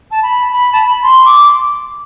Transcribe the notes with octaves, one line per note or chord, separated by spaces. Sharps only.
A5
B5
B5
A5
B5
C6
D6